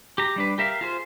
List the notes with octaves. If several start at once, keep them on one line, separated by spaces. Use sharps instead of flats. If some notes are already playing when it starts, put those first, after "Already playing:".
G4 A#5
G3 D4 B4
G4 A#4 E5 F5
F4 G#4 C5